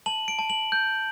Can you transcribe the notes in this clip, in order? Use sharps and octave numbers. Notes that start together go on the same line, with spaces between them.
A5 F#7
D7
A5
F#7
G6